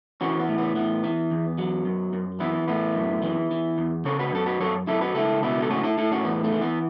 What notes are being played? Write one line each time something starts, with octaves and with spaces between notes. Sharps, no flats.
E3 C#4 F#4
B3
A2
B3
E3 B3
E3
E2
F#3
F#2
F#2
E3 B3 E4
A2 B3 E4
F#2
E3
E3
E2
C#3 A4 C#5
F#4 B4
F#2 A4
F#4 B4
F#2 A4 C#5
F#2 E4 A4
F#4 B4
C#2 E4 A4
B2 B3 E4
A4
A2 C#4 F#4
E4 A4
A2 E4 A4
C#4 F#4
E2 B3
A3
E3
B3